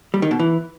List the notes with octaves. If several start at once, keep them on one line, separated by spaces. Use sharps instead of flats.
G3
D#3
B2
E3